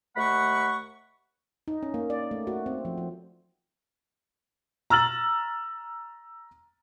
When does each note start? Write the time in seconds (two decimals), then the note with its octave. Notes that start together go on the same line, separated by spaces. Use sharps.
0.17 D#2 A3 F#5 B5 C#6
1.68 D#4
1.83 C#4
1.94 A#3
2.10 D5
2.31 A3
2.47 F#4
2.66 C4
2.85 F3
2.98 F3
4.90 A#5 E6 F6 A6 F#7